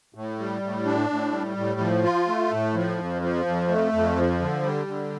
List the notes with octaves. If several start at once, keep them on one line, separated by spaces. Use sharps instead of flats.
A2
G3
A2
D4
A2
G3
A2
F3
F4
A3
A2
F3
F2
F3
F2
A3
F2
F3
D3
G3
D3